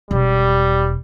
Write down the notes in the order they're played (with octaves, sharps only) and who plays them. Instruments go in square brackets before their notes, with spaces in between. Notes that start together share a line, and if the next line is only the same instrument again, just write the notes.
[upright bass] E1 [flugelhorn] G3